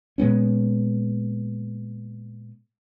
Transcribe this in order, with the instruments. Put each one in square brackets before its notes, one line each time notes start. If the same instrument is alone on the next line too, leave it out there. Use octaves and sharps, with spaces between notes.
[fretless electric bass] A#2 G#3 B3 C#4